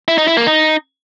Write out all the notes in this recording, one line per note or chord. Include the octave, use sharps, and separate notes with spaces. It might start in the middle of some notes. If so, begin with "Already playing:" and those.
E4
D#4
E4
A#3
D#4